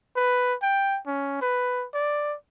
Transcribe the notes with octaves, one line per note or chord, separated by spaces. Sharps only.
B4
G5
C#4
B4
D5